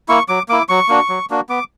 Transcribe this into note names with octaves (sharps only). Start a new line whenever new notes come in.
A#3 E4 C#6
F#3 D6
A#3 E4 D6
F#3 C#6
A#3 D4 F#4
F#3
A#3 D4 F#4
B3 D6